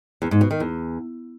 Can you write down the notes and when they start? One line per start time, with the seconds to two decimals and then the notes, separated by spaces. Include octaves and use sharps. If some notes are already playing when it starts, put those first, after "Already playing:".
0.22 E2
0.31 G#2
0.41 B2
0.51 D#3
0.60 E2